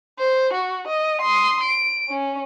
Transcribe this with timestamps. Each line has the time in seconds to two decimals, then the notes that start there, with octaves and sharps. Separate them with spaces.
0.19 C5
0.53 F#4
0.87 D#5
1.21 C6 D#6
1.63 D7
2.09 C#4